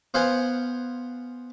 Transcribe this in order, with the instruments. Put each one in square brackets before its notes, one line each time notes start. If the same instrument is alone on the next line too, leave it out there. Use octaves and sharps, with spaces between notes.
[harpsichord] B3 F4 C5 F5 F#5 G#5